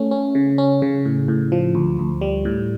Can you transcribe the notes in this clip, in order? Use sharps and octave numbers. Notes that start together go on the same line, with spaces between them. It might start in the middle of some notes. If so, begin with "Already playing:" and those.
Already playing: A3 C#4
C#4
C#3
C#4
C#3
A2
A2
F3
D2
D2
G3
A2